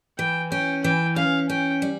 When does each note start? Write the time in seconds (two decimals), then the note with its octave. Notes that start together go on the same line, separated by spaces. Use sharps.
0.18 E3 G5
0.51 C#4 G5
0.84 E3 G5
1.16 C#4 F5
1.50 C#4 G5
1.82 G3